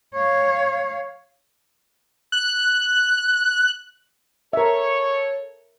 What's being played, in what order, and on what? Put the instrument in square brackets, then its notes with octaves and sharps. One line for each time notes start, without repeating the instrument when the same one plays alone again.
[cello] C#5 F5
[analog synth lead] F#6
[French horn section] A4 C#5 [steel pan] A#4 E5